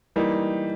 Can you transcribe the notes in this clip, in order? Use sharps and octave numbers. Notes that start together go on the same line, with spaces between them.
E3 G3 A#3 D#4